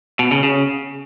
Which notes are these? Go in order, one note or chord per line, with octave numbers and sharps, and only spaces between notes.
B2
C#3
C#3